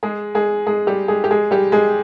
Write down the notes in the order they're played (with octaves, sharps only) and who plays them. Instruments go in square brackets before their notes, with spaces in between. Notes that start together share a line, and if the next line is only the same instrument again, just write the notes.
[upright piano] G#3 G#4
G#3 G#4
G#3 G#4
G3 G4
G#3 G#4
G4
G#3 G#4
G3 G4
G#3 G#4